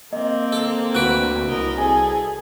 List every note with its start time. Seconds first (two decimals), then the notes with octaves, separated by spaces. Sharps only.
0.13 A#3 C4 D#5
0.52 A4
0.95 D2 F#4 B4 F#6 D7
1.47 C2 A#4 D#5
1.78 G#4 A4 G#5